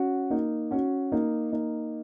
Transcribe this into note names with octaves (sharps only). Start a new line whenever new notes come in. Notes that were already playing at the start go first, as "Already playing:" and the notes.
Already playing: C#4 F#4
A#3 D#4
C#4 F#4
A#3 D#4
A#3 D#4